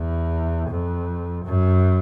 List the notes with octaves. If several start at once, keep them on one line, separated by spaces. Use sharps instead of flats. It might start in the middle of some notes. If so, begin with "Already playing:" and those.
Already playing: E2
F2
F#2